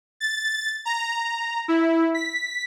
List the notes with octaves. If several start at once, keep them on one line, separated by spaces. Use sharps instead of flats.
A6
A#5
E4
B6